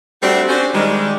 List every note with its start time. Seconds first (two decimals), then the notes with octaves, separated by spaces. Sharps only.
0.23 G3 A3 C4 D4 F#4 G4
0.49 C#4 D4 F#4 C5
0.75 D#3 G3 G#3